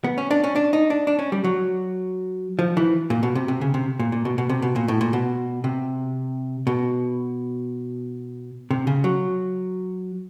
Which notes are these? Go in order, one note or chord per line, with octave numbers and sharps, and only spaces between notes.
B3
C#4
D4
C#4
D4
D#4
D4
D4
C#4
G3
F#3
F3
E3
A#2
B2
C3
C3
C#3
C3
A#2
A#2
B2
B2
C3
B2
A#2
A2
A#2
B2
C3
B2
C3
C#3
F#3